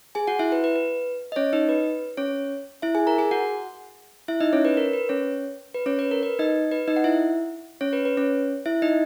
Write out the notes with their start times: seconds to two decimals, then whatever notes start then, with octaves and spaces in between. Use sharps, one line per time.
0.15 G#4 G#5
0.27 F#4 F#5
0.39 E4 E5
0.52 B4
0.64 B4
0.76 B4
1.32 D#5
1.36 C#4 C#5
1.53 D#4 D#5
1.69 B4
2.17 C#4 C#5
2.82 E4 E5
2.95 G#4 G#5
3.07 A#4 A#5
3.18 G#4 G#5
3.31 F#4 F#5
4.28 E4 E5
4.40 D#4 D#5
4.53 C#4 C#5
4.65 B4
4.77 A#4
4.93 B4
5.09 C#4 C#5
5.74 B4
5.86 C#4 C#5
5.99 B4
6.11 A#4
6.23 B4
6.39 D#4 D#5
6.72 B4
6.88 D#4 D#5
6.96 F#5
7.04 E4 E5
7.81 C#4 C#5
7.93 B4
8.05 B4
8.17 C#4 C#5
8.66 E4 E5
8.82 D#4 D#5